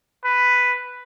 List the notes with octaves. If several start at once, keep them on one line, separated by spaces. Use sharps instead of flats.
B4